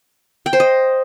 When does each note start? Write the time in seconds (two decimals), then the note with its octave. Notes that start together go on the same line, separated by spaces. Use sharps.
0.46 G5
0.53 C5
0.60 D#5